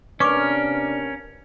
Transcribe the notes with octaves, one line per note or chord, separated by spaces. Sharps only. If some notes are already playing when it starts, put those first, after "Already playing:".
C3 A#3 C#4 D4 A#4 B4 C#6 D6